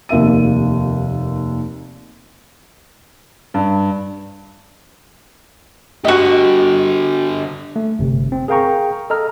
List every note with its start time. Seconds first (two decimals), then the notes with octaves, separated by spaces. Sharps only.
0.09 F1 D#2 A#3 E5 D#7
3.54 G2
6.05 D3 F#4 G4 D#5
7.76 A3
7.99 G1 C3
8.32 C4
8.48 G#4 A#4 F5 G5 A#5 C#6
9.10 A4 D#5 A#5 F6